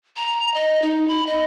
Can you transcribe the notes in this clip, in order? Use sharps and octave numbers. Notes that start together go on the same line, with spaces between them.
A#5
D#5
D#4
B5
D#5